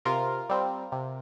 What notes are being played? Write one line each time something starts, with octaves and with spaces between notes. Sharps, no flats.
C3 F4 A#4
G3 C4
C3